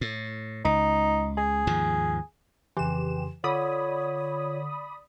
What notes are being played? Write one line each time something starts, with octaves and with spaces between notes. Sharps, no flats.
A2
C#2 D#4
G#4
D#2 G#2 F3
F2 C#3 E3 G4 C6 E7
D3 F4 C#5 D5 B5 D#6